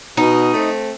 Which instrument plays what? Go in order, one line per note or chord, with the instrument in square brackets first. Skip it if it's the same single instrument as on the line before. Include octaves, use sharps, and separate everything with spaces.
[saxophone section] B2 [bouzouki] D#4
[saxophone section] A3 C4